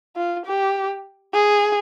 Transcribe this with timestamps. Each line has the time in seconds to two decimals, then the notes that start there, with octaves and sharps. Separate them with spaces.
0.16 F4
0.45 G4
1.34 G#4